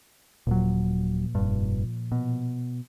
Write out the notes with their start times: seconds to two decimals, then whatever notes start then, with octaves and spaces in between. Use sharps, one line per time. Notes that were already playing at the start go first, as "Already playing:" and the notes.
0.47 D#1 A#2 F3 F#3
1.35 F1 G2
2.12 B2